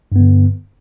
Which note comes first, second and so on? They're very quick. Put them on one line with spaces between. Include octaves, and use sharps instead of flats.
G2 B3 D3